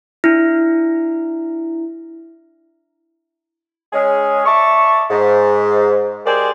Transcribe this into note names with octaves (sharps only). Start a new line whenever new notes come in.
D4 E4
G#3 C#4 G#4
D5 E5 A5 C#6
G#2
G#3 G4 G#4 A#4 C5 D5